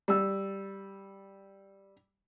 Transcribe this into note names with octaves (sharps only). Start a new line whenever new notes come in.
G3 E6